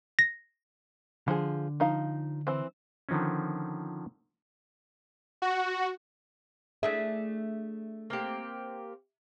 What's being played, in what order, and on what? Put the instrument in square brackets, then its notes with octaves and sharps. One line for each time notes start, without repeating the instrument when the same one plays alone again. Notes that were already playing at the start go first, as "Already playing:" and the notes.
[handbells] A#6
[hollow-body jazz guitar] D3 [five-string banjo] F3 G#4
[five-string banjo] F3 D#4 F5
E3 C4
[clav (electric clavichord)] D3 D#3 F3 C4 C#4
[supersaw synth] F#4
[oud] A3 D4 G#4 [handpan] E5
[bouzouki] A#3 C4 G4